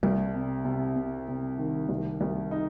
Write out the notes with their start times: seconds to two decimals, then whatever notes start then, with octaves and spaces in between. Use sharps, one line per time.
0.03 C2 G3
0.34 C3
0.65 C3
0.96 C3
1.28 C3
1.58 D#3
1.89 C2
2.21 C2
2.51 D#4